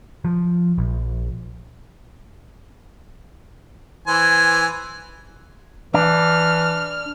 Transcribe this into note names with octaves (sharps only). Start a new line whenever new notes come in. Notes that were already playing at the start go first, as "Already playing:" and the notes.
F3
A#1
E3 C5 G#5
E3 D4 F6